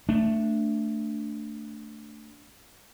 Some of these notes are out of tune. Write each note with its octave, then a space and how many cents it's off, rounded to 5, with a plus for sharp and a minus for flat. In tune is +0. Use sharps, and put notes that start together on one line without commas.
A3 +10 D4 -5